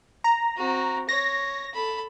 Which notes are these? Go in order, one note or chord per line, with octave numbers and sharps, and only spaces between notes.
A#5
C4 F#4
C#5 A#6
A4 B5